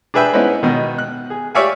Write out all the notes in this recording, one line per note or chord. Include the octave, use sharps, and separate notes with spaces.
D4 G#4 B4 E5 G5 B5
B3 C#4 D#4 E4 B4 C5
B2 D#3
F#6
G#4
G4 C#5 D5 E5 F5 G#5